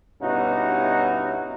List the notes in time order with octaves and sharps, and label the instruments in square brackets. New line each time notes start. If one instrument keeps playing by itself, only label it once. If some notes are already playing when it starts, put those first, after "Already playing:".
[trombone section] G2 B2 C#4 D#4 E4 F#4